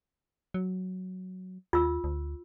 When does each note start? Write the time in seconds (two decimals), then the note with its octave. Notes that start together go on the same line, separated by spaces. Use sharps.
0.54 F#3
1.73 D#2 F4 E6
2.04 D2